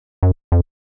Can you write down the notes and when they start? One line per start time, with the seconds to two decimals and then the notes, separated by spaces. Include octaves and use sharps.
0.23 F#2
0.52 F2